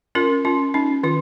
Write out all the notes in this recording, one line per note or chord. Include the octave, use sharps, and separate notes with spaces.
C#4 F4 A#4
C#4 F4
C#4 D#4
D#3 F4